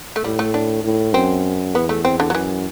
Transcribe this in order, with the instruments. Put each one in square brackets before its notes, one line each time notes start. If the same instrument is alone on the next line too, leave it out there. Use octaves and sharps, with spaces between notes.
[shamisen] A3
[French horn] A2 [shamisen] G3
[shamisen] A3
D4
[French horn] A2
[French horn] F#2 [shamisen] C4
[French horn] E2 [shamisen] B3
[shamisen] A3
C4
D3
F#3
[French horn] F#2 [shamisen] E3